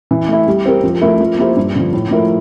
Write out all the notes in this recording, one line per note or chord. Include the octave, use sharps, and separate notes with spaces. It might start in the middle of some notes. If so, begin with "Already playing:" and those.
E3
A3 E4
G3
C4 G4 A#4
F3
A3 E4 A#4
F3
A#3 E4 G4 C5
G2
D3 F3
A2
F3 A3 E4 A#4